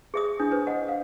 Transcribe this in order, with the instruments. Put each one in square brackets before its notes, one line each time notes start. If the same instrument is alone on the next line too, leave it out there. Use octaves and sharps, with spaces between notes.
[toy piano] G#4 E5 D#6
[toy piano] D4 [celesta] E4 G#4 D#6
[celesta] B4 C5
[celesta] C5 D#5 [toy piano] F#5
[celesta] F5